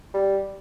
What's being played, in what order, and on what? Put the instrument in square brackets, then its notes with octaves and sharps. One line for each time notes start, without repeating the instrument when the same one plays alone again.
[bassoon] G3